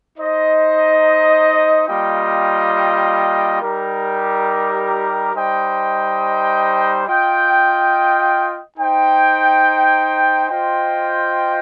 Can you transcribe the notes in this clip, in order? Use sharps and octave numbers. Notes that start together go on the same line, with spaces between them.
D#4 C5 D#5
G3 A#3 F4 D#5 G5
G3 D#4 G4 A#4
G3 D#4 C5 D#5 G5
F4 D#5 G5
D#4 C5 G5
F4 C5 D#5 G5